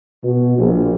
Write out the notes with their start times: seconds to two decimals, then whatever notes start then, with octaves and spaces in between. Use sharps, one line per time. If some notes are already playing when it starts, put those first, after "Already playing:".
0.24 B2
0.58 A#1